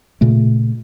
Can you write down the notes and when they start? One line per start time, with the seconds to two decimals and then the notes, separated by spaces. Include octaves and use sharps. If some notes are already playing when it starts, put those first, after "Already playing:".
0.21 A#2 C#3 A3